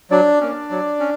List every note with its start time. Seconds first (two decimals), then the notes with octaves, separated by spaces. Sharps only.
0.11 F#3 D4 D5
0.41 A#3 C#4
0.70 F#3
1.00 C#4